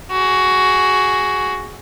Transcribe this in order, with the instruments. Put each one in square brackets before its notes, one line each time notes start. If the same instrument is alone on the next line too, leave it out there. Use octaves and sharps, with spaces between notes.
[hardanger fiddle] F#4 G#4